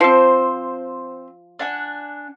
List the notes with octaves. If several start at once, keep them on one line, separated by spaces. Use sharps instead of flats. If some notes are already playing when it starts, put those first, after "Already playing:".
F3 C4 C5
D4 F#5 G#5